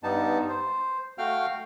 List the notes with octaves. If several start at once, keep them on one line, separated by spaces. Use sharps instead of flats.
G2 G3 B3 D#4 A5
C5
A3 F#4 F5 G5 F6